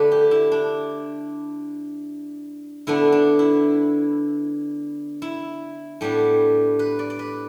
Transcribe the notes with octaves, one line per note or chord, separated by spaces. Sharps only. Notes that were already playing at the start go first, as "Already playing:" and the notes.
Already playing: D3 A3 D4 B4 D5
G4
E4
D4
D3 B3 D4 E4
D4
E4
E4
A2 G3 B3 D4 G4
B4
D5
D5
B4